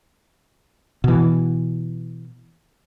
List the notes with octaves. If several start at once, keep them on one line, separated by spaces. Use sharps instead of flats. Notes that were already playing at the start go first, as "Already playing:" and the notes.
B2 E3